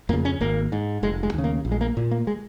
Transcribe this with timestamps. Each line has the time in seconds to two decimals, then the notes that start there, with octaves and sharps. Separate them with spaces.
0.09 F2 A#3
0.13 C#3
0.25 C#4
0.41 G#1 A#3
0.72 G#2
1.03 F1 G#3
1.23 G#3
1.34 D#2 C#3
1.44 A#3
1.65 A#1
1.72 G#3
1.81 A#3
1.97 A#2
2.11 A#3
2.27 G#3